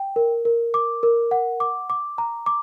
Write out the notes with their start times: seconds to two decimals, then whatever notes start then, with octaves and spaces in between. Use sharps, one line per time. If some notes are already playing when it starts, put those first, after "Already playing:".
Already playing: G5
0.16 A#4
0.45 A#4
0.74 D6
1.03 A#4
1.31 F#5
1.60 D6
1.90 D6
2.18 A#5
2.46 D6